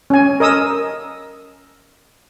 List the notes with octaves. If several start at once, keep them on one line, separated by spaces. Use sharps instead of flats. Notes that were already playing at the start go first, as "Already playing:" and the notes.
C#4 G#5
A#4 D#5 D#6 E6